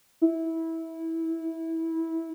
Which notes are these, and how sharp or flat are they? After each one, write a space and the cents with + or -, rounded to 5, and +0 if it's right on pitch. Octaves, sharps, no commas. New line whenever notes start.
E4 -15